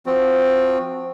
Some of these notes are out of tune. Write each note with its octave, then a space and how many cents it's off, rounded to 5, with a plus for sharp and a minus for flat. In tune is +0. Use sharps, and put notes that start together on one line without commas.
F3 +0 C4 +0 F#4 -15